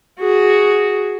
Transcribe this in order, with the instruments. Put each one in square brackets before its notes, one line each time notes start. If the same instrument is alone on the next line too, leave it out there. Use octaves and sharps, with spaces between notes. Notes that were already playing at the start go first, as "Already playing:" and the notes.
[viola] F#4 G#4